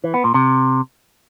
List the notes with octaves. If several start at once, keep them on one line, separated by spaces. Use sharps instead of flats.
E3
B3
A#2
C3